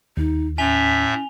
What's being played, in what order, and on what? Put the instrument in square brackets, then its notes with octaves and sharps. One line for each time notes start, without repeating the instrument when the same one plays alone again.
[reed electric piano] D#2 [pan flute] D#4
[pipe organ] A2 E5 [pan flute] C#4 [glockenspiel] G#5 F7 G7